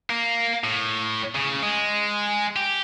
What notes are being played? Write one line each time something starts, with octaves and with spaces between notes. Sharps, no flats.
A#3
A2
C#3
G#3
G4